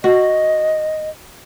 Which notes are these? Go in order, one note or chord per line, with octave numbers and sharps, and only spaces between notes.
F#4 D#5